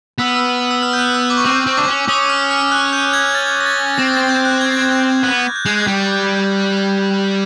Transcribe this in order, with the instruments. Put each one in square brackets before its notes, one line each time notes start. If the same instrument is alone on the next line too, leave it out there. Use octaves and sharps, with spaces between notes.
[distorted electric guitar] B3 [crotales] E6
[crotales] F6
E6
E6
F6
G6
F#6
E6
D6
C#6
[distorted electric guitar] C4 [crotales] D6
[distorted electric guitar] C4 [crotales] C#6
[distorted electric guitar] D4 [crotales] D6
[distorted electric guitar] C#4
[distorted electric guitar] C#4 [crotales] D#6
[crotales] F6
F6
F#6
G6
G#6
A6
A#6
A6
A6
[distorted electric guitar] C4 [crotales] A#6
[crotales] A6
G6
F#6
G#6
A6
G#6
G6
[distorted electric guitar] B3 [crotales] F#6
[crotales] G6
G6
[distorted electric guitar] G#3 [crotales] G#6
[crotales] G6
[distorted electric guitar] G3